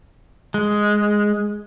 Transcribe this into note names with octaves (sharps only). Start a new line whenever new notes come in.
G#3